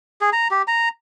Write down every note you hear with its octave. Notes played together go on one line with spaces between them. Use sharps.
G#4
A#5
G4
A#5